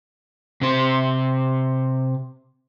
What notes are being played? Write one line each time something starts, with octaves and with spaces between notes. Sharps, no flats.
C3 C5